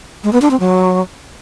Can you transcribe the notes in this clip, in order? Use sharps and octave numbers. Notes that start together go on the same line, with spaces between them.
G#3
B3
D4
C4
F#3